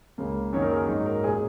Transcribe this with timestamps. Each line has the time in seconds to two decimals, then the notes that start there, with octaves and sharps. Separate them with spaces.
0.18 C#2 C#3 A#3
0.53 F#2 D#3 F#3 A#3 D#4 C#5
0.62 A#4
0.71 G#4
0.80 A#4
0.88 G#2 F#3 D#4
1.06 A#4
1.24 A#2 G#3 C#4 G#4